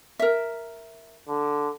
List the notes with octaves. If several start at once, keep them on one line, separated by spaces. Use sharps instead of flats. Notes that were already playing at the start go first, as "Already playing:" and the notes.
A#4 E5
D3